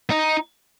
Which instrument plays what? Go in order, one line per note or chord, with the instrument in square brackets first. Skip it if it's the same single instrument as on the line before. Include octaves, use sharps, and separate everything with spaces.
[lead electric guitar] D#4